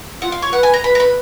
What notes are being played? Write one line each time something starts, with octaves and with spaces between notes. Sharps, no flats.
F4 F#5
F5
C#5
B4 F#5
G#5
A#5
B4 B5
A#5
B5